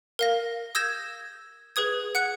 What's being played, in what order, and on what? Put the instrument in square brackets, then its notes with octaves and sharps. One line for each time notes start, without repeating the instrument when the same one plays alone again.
[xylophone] A#4 F5 A#6
D#6 E6 G6 G#6 A#6 E7
G#4 B4 D#6 G#6
F#5 F#6 C#7